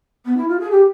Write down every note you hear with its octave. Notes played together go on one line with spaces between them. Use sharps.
B3
E4
F4
G#4
G4